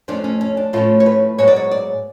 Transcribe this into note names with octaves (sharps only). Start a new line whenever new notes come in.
F2 F3 A3 C#4 D4
C#4
C#4
D4
A2 F3 A3 C#4 F4
C#5
B4
G#2 F#3 B3 C#5
D5
C#5
D5